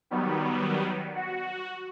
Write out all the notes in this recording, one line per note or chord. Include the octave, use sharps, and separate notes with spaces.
D#3 F#3 G3 B3
F#4